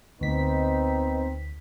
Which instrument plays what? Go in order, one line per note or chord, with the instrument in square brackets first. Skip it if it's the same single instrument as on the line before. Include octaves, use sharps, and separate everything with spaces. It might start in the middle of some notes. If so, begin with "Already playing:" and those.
[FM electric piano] D2 B6 [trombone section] B3 C4 D#4